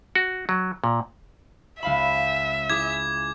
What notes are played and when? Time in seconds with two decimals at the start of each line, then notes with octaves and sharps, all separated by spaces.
0.15 F#4
0.49 F#3
0.84 A#2
1.83 C#2 E5 F5 B5
2.70 E4 G#4 D6 G#6